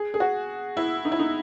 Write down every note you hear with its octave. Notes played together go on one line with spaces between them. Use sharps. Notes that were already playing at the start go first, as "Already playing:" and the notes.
Already playing: G#4
G#4
F#4
E4
D#4
E4
D#4